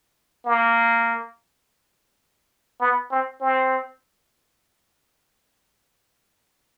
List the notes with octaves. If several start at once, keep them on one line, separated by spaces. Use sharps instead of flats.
A#3
B3
C4
C4